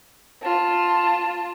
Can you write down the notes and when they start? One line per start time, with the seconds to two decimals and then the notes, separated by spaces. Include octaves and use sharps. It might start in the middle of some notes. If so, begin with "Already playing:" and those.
0.42 F4 A5